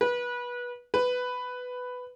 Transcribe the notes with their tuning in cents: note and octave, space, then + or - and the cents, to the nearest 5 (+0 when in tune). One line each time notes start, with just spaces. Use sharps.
B4 -20
B4 +10